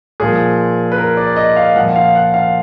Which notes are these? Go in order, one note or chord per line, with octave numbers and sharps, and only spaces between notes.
A#2 F3 G#4
B4
A#4
D5
D#5
F5
A#2 F3 F#5
F5
F#5
F5